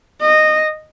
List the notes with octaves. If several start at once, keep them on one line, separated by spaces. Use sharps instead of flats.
D#5